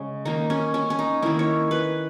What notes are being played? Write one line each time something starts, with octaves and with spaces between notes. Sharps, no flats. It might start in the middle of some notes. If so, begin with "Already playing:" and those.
Already playing: C#3 G#3
D#3 A#3 D#4
C#4
C#4
C#4
D#4
D#3 A#3 E4
C#5
B4